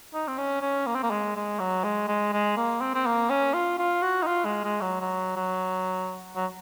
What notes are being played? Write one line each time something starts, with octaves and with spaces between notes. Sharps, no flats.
D#4
C4
C#4
C#4
A#3
C4
A#3
G#3
G#3
F#3
G#3
G#3
G#3
A#3
C4
C4
A#3
C#4
F4
F4
F#4
D#4
F4
G#3
G#3
F#3
F#3
F#3
F#3